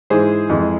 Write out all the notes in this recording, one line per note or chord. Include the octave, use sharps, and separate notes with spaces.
G#2 E3 G#3 G#4 C5
F2 E3 G#3